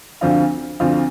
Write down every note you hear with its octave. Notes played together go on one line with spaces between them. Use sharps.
D2 D3 F3 C4 F4
D2 D3 F3 C4 F4